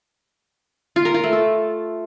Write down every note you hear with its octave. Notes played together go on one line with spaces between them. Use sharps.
F4
A#4
F4
A3
A4